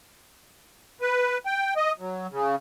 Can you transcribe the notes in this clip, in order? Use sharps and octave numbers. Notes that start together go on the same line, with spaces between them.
B4
G5
D#5
F#3
C#3